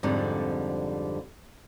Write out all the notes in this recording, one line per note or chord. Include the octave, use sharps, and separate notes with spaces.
F2 G#2 D3 G3 C4 D#4